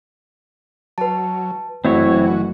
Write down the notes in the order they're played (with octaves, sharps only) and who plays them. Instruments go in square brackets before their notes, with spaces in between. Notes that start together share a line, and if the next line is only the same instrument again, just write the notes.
[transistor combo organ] F#3 [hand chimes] B4 A5
[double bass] F#1 F#2 [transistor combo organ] E3 F#4 [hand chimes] A3 [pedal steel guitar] C4 E4 C#5